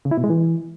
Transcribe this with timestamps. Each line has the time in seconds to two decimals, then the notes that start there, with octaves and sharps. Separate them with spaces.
0.05 C#3
0.11 E4
0.18 B2
0.24 G#3
0.30 E3